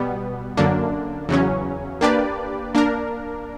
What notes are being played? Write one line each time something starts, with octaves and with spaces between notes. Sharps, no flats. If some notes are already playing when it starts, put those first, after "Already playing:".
Already playing: B2 G3 B3
F#2 D3 A#3 D4
E2 C#3 F#3 C#4
A#3 D4 G4 B4 D5
A#3 D4 A#4